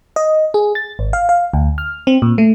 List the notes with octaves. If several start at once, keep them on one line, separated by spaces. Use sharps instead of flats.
D#5
G#4
A6
G#1
F5
F5
D2
F6
C4
A#2
A3